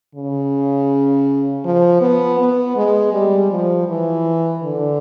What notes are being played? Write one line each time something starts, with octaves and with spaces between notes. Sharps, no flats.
C#3
F3
B3
B3
G#3
G3
F3
E3
D3